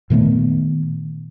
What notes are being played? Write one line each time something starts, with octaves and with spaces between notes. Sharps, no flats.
A#2 D#3 A3 B3